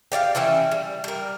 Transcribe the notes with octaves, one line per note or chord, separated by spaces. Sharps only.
G4 D5 E5 F5
E3 C#4 E4 G4
G3
G3 A#4